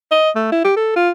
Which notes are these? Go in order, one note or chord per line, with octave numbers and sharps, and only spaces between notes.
D#5
A3
E4
G4
A4
F4